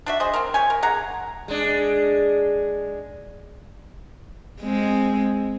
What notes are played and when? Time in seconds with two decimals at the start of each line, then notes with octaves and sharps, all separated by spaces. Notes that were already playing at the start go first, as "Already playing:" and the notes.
0.06 D4 F#4 E5
0.20 G#4 C5 D#5
0.34 C4 A#4
0.54 G4 C#5 G#5
0.70 A#4
0.83 D3 G#4 F#5 A#5
1.48 G#3 D4
4.61 G#3 C4